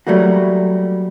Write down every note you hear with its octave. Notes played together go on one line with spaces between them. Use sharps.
F#3 G3 A3 A#3 F#4